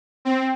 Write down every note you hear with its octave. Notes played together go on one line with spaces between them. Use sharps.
C4